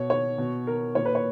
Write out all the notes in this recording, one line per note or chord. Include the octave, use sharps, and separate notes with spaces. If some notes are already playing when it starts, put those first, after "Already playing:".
Already playing: B2 C#5
C#5
B2
A#4
A#2 C#5
B4
C#5